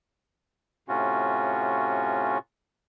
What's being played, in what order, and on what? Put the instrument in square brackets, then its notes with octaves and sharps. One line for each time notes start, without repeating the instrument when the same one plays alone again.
[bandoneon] A2 C3 C#4 F4 F#4